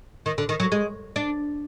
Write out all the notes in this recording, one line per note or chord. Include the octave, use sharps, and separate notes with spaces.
D#3
D3
D#3
F#3
G#3
D4